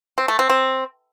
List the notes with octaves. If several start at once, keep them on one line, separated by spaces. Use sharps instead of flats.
C4
A3
C4
C4